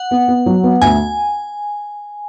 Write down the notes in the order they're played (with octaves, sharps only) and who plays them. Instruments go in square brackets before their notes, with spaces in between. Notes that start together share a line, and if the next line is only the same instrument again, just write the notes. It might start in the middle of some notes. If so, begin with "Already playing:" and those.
Already playing: [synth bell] F#5
[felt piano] B3
B3
F#3
B3
[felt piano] D2 [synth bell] G#5